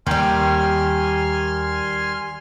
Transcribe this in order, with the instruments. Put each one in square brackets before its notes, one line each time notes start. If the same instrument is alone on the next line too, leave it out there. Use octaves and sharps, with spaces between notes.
[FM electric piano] D#2 [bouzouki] D#3 G3 [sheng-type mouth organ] G#5 C6 F6